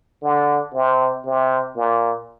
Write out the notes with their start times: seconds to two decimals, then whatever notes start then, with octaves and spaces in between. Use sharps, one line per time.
0.23 D3
0.74 C3
1.26 C3
1.76 A#2